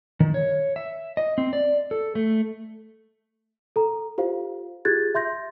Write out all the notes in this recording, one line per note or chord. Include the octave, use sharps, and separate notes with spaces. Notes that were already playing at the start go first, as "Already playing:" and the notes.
D#3
C#5
E5
D#5
C4
D5
A4
A3
A4 A#5
F4 G4 C5 F5
F4 G4 G#4 F#6 G#6 A6
E5 C6 G6 A#6